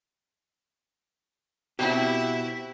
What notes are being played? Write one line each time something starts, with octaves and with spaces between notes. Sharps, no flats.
B2 C4 E4 G4